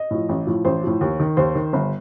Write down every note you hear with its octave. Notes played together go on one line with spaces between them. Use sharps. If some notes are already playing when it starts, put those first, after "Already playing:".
Already playing: D#5
A2 F3
A1
A2 F3
A1 C5
A2 F3
D#2
D#3
D#2 C5
D#3
G1